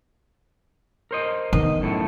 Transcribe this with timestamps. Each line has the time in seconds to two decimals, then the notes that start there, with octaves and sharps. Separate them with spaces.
1.11 A#4 C5 D#5
1.53 D#3 B3 D#5
1.81 F#2 A2 A3